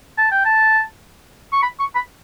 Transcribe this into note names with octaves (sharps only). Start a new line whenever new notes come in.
A5
G5
A5
C#6
B5
C#6
B5